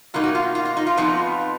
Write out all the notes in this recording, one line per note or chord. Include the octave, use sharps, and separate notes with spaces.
B2 F#3 A#3 D#4 F4
F#4
F4
F4
F4
D#4
F4
F2 F3 B3 D#4